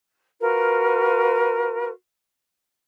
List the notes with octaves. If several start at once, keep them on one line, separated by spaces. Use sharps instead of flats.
F4 F#4 A#4 B4